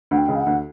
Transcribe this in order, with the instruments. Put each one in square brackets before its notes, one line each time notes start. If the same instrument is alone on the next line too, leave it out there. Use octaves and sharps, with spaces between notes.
[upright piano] D2 D3 [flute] F#5
[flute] G5
[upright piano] C#2 C#3
[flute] F5
F#5
[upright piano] D2 D3